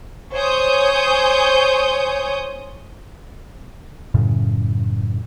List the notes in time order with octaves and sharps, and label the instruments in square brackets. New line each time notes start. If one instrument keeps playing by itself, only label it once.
[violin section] C5 C#5 G#5 C#6 D#6 G6
[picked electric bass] F#2 A2 C#3